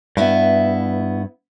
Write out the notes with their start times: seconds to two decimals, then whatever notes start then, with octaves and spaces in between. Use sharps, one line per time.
0.17 G2 B3 E4 E5